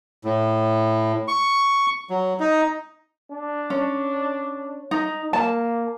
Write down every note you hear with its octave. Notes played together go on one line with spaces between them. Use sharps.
A2
C#6
F#3
D#4
D4
C#4
D#4
A#3 A5